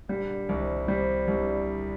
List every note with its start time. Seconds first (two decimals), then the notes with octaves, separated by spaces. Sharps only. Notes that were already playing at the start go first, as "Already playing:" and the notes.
0.08 A#2 D3 G3
0.48 C2 C3 D#3
0.87 C3 D#3 G3
1.27 C2 A#2 D3